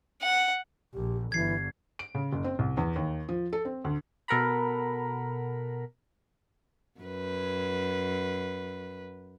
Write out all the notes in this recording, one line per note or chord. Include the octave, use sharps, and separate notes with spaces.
F#5
A#1 G4
G1 E3 G#6 C7
D7
C#3
F#1
C4
C2
E2
D#2
F3
A4
C4
D2
B2 A4 A#4 F#5 A#5 B5
F#2 B4